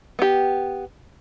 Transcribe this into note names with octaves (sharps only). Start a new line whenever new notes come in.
B3 G4